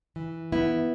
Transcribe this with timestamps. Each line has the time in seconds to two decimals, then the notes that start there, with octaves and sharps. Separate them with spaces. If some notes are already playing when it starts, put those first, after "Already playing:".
0.16 E3
0.52 B3 E4